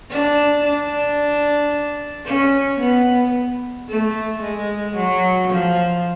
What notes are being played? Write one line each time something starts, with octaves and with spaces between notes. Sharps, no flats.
D4
D4
C#4
B3
A3
G#3
F#3
F3